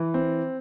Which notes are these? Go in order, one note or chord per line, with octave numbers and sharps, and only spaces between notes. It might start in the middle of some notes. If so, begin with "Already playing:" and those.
Already playing: E3
C4